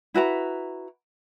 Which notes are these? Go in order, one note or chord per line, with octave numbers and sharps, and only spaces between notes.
E4 F#4 B4 A#5